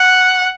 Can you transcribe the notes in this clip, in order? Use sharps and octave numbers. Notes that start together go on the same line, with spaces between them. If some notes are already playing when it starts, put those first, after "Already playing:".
Already playing: F#5